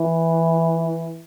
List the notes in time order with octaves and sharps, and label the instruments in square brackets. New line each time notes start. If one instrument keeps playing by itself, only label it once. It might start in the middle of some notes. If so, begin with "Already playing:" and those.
Already playing: [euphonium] E3